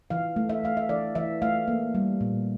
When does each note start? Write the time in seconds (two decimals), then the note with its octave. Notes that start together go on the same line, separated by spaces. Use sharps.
0.10 E3 F5
0.36 A3
0.49 E5
0.64 A3 F5
0.77 E5
0.89 E3 D5
1.15 E3 E5
1.42 A3 F5
1.68 A#3
1.95 G3
2.21 A#2